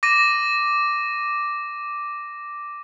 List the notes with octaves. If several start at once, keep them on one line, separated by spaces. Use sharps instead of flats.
D6 A#6 D#7